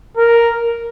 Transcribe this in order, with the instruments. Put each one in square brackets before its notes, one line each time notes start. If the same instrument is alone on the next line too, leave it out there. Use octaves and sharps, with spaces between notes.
[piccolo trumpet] A#4